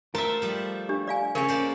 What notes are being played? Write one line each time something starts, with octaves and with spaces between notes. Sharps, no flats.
A3 F4 A#4 C5 E5 A5
F3 G3
D4 G4
D5 F5 G#5
C#3 F3 A#4 C#5 G#5
A#3 C5 D5